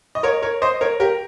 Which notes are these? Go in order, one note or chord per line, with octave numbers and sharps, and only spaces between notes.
D#5
A#4 C#5
A#4 C#5
C5 D#5
A#4 C#5
G4 A#4